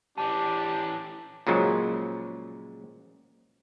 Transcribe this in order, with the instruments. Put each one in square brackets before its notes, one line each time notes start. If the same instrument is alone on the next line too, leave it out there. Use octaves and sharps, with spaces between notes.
[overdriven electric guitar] E3 C#4 [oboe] D4 [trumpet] G4 [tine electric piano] A5
[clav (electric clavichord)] A#2 C#3 F3 F#3 G#3